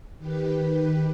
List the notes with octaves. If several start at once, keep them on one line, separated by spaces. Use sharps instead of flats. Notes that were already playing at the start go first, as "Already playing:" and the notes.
D#3 G4 B4